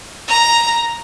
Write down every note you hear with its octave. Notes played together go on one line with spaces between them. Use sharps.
A#5